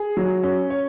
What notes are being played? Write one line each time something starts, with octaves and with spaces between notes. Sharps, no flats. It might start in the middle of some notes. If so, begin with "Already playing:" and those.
Already playing: G#4
F#3
C#4
C#5